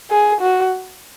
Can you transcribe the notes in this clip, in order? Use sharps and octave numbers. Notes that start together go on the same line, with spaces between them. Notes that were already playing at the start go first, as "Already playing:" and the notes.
G#4
F#4